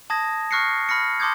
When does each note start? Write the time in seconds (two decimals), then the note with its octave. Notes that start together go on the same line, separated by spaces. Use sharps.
0.10 A5 D#6 G#6 A#6
0.51 C#6 F6 F#6 A#6 C7 C#7
0.89 B5 F6 A#6 C#7
1.20 A5 C6 D6 D#6 G6 G#6